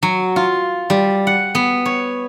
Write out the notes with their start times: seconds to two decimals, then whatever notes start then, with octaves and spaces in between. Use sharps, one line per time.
0.03 F#3
0.36 F4
0.90 G3
1.27 F#5
1.55 B3
1.85 C#5